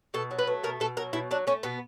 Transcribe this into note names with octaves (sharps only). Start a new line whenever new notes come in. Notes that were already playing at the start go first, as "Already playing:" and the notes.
B2 A4
F#3
B4
A3
B2 A#4
B2 A4
F#3 A#4
B2 E4
F#3 D4
A3 C#4
B2 B3